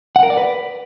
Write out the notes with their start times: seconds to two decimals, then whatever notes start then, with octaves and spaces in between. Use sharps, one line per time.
0.16 F#5
0.23 A#4
0.30 D5
0.37 B4